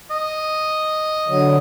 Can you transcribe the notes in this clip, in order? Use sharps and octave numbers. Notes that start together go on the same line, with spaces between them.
D#5
D3 F#3